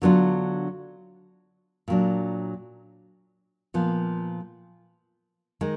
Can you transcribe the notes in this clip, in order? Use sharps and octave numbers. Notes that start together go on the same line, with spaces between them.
D3 F#3 B3 D4 F4
A#2 F#3 D4
A#2 F3 B3
D#3 G#3